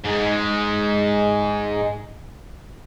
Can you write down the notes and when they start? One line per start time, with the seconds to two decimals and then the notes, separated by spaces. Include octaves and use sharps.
0.05 G#2 G#3